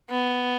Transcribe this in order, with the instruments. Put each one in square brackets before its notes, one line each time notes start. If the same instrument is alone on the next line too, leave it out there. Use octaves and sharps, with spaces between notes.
[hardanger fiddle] B3